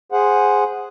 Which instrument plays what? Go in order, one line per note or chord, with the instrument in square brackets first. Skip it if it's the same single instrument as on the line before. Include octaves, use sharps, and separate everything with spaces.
[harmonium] G#4 C5 F#5